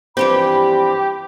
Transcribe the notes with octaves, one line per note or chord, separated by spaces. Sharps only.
G2 E3 F3 C4 G4 B5